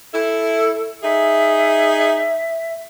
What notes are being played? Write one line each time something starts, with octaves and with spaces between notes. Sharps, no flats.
E4 A4
D#4 G#4 E5